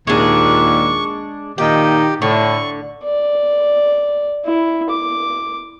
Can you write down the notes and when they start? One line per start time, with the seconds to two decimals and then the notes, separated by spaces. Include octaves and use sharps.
0.07 D#2 A#2 G#3 D4 C#6
1.58 A#2 D#3 D#4 G4 G5
2.22 A2 D3 C#6
3.04 D5
4.45 E4
4.90 D6